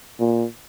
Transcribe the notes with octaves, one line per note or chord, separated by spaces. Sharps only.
A#2